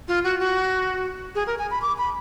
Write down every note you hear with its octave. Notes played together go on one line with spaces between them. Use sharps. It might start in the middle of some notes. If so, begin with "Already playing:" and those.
F4
F#4
F#4
G#4
A#4
G#5
B5
D6
B5